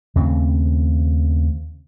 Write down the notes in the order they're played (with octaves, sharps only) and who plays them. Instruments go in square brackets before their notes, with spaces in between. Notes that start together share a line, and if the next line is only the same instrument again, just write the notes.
[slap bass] D#2 C#3 A3 C4